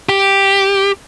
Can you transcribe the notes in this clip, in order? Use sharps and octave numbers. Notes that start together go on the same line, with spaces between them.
G4